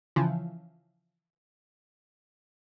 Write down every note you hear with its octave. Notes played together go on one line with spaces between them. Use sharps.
C#3 E3 F3